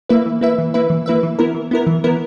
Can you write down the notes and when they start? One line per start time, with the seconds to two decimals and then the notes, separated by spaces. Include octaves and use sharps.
0.09 A#3 E4 B4 E5
0.26 E3
0.41 A#3 E4 B4 E5
0.58 E3
0.74 A#3 E4 B4 E5
0.90 E3
1.06 A#3 E4 B4 E5
1.23 E3
1.39 B3 E4 A#4
1.54 E3
1.71 B3 E4 A#4
1.87 E3
2.04 B3 E4 A#4